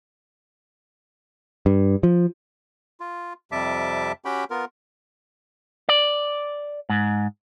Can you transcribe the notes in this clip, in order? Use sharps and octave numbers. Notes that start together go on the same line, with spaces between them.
G2
F3
F4
F2 C3 G3 E5 A5 D6
C#4 F#4 G4 G5 B5
B3 F4 A#4
D5
G#2